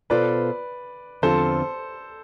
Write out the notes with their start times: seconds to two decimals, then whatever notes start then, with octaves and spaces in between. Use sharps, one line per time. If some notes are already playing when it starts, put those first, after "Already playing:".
0.10 B2 B3 F4 A4 B4 C5 D5
1.22 E2 D3 F3 C4 F4 A4 C5